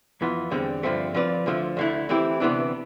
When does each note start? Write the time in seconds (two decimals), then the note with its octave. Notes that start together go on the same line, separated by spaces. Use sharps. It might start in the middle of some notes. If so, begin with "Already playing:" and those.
0.21 F2 E3 B3 F4
0.51 E2 D3 G3 C4
0.83 G2 D3 F3 A3 C4
1.14 F3 C4 F4 B4 D5
1.46 D2 D3 F3 A3
1.77 D2 D3 A3 E4
2.09 E3 A3 C4 E4 G4
2.40 D2 C3 E3 B3 D4